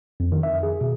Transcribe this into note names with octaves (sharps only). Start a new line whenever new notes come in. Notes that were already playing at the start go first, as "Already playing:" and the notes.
F2
D#3
E5
G#4
B2